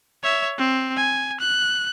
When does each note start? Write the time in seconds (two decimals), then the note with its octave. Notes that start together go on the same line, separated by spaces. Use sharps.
0.23 C#5 E5
0.58 C4
0.97 G#5
1.40 F#6